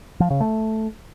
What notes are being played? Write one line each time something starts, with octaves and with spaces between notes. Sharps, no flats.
F3
C#3
A3